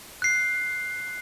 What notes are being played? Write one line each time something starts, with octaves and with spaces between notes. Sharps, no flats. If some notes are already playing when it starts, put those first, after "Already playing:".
F#6 C7